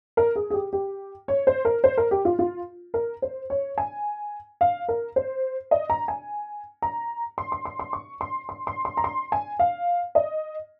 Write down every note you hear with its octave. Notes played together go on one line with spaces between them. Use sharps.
A#4
G#4
G#4
G4
G4
C#5
C5
A#4
C5
A#4
G4
F4
F4
A#4
C5
C#5
G#5
F5
A#4
C5
D#5
A#5
G#5
A#5
C6
C6
C6
C6
C#6
C6
C6
C6
C6
A#5
C6
G#5
F5
D#5